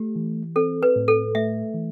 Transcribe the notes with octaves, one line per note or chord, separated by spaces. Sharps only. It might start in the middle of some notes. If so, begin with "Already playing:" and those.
Already playing: A3 G4
E3
C4 A4
B4
A2
A4
A3 E5
E3